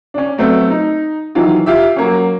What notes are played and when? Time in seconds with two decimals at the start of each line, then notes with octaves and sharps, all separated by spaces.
0.14 C#4 D4
0.38 F#3 A3 B3 C4
0.71 D#4
1.35 D#3 E3 F#3 F4
1.66 F4 G4 E5
1.96 F#3 A#3 C#4